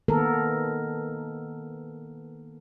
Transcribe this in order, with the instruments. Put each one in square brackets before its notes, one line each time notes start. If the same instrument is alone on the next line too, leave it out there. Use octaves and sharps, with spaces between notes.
[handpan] D#3 A#3 B3 A4 A#4